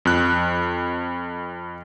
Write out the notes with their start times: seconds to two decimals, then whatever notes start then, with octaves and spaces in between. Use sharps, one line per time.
0.05 F2 F#6